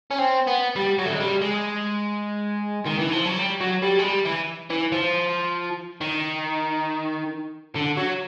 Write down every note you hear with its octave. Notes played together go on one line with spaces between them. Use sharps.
C#4
C4
B3
G3
F#3
A3
G#3
G3
G#3
D#3
E3
F3
F#3
G3
F#3
G3
G#3
G3
E3
E3
F3
D#3
D3
F#3